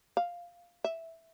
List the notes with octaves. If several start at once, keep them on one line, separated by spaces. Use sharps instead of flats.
F5
E5